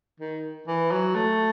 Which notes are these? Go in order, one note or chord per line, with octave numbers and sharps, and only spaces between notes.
D#3
E3
F#3
A3